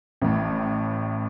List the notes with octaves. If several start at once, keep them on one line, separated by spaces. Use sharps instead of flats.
A1 A2